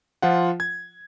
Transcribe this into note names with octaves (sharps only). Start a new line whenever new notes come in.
F3 F4 F#5
G#6